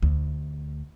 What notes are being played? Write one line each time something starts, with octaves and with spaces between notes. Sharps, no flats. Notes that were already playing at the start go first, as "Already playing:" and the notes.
D2